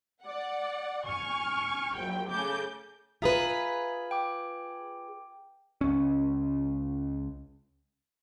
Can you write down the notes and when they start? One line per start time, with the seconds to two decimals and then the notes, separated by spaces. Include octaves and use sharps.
0.23 D5 F#5
1.06 G#5 C#6 F6
1.96 A#1 F#3 G5
2.31 C#3 A3 A4 D6 G6
3.22 F4 G#4 B4 E5 A#5 D#6
4.11 G5 D6
5.81 C#2 C#4